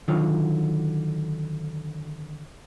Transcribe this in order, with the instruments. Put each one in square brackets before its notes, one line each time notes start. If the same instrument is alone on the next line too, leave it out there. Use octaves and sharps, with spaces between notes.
[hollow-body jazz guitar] D3 D#3 F#3 F4